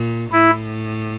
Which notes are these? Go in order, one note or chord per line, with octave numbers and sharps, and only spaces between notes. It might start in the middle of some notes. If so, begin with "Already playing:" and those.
Already playing: A#2
A2 E4